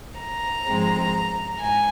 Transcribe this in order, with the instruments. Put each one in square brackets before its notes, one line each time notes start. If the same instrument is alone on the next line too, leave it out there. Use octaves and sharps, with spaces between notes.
[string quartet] A#5
G#2 F3 G#3 C4
G#2 G#5